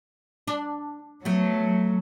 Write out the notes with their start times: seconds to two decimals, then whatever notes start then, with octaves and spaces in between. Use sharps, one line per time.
0.47 D4
1.25 F#3 A3 B3